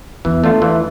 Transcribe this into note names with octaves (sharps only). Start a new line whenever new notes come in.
E2 E3
A3 D4 F4
E3